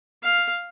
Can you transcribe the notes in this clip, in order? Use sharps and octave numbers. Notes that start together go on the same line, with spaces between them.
F5